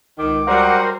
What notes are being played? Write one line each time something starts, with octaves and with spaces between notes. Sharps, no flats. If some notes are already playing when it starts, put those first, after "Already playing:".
C#2 D#3 D6
F#3 G3 A#4 C5 F#5